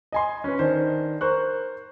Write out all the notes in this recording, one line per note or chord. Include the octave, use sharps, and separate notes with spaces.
D#5 G#5 C6
C#4 B4
D#3 D4 C5
A#4 C5 C#6 F#6